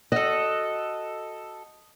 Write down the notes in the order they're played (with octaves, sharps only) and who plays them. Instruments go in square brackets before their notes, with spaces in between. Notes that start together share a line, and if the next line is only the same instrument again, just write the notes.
[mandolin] F#4 A4 [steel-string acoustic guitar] D#5